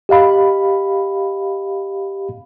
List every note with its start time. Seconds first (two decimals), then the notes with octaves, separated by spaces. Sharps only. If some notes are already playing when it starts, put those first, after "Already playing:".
0.09 G4 D#5 F5 B5